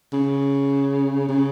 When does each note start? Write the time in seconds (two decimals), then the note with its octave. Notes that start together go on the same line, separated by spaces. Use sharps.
0.13 C#3
1.29 C#3